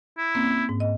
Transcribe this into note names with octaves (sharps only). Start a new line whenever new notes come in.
E4
A#3 C4 C#4
G#2
D#5